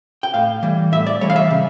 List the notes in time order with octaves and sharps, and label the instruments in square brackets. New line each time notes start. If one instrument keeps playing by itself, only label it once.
[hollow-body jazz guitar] G5
A2 F5
E3 G3
A2 E5
D5
E3 G3 C#5
F5
E5
C#3